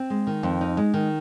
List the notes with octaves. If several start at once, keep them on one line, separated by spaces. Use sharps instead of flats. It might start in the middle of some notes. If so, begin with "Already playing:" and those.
Already playing: C4
G#3
D#3
F2
D#4
G#3
D#3